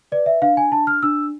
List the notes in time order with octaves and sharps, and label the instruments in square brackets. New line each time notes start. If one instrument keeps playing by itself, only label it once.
[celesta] B4 D5
E5
D4 F5
G#5
D4 A5
F6
D4 E6